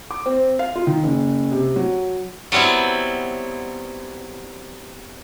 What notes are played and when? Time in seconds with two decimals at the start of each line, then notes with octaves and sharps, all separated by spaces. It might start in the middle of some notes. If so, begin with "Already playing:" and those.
0.11 D6
0.26 C4
0.59 F5
0.75 F4
0.87 D#3
1.04 F#1
1.52 C3
1.76 F#3
2.52 F#3 G3 B3 C4 E4